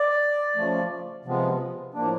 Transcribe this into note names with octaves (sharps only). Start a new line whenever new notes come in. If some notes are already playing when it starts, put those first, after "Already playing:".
Already playing: D5
C#3 F3 A3
C3 F3 G#3 B3
A2 F3 A#3 D4